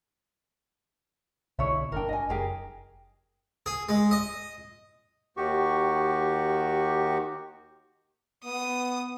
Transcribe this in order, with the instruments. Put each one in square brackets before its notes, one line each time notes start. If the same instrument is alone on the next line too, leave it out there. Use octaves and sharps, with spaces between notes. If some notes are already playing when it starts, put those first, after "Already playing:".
[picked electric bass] C2 B2 D3 [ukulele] E4 C#5 E5
[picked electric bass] G1 D3 D4 [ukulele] A#4 G5
[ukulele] D#5 G#5
[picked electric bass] F#1 [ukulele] G4 G#4 A#4
[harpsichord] G#4
G#3
D#5
[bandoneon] D#2 D#3 F#4 G4 C#6
[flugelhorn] B3 [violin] D#6